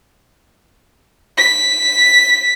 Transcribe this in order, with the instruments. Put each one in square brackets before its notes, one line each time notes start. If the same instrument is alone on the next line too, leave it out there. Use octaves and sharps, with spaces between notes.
[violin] B6